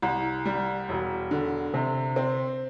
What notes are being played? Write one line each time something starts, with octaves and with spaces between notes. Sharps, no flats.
C2
G3
E1
D3
C3
C4